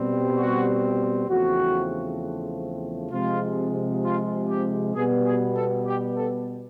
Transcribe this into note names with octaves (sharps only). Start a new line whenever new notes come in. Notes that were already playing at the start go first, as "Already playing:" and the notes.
Already playing: B2 G3 C4
F#4
E2 C#3 F3 A3 C4 F#4
C3 F3 G#3 F4
F4
G4
B2 G3 B3 G#4
G#4
A4
G4
A4